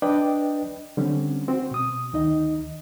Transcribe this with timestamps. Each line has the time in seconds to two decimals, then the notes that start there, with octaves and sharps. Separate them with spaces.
0.02 D4 B4 D5 D#5 G5
0.97 D3 G3 C4 C#4
1.48 C4 F#4
1.71 B2 D#6
2.13 D2 D#3 D#4 D#5